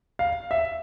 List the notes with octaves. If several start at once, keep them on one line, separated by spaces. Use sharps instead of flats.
F5
E5